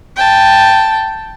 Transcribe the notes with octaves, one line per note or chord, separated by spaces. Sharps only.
G5 A5